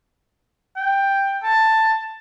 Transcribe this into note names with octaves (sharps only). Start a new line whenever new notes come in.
G5
A5